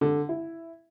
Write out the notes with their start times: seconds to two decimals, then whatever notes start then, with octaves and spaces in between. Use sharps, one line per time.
0.01 D3
0.29 E4